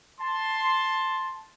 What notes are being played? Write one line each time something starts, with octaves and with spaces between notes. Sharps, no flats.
A5 C6